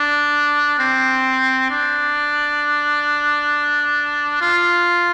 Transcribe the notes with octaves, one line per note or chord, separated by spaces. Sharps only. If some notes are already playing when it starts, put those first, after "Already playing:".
Already playing: D4
C4
D4
F4